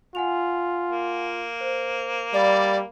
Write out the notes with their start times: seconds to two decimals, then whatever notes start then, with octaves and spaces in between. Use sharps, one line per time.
0.15 F4 F#5 G#5 F7
0.90 A#3
1.61 C5
2.33 G3 D5 F5 B5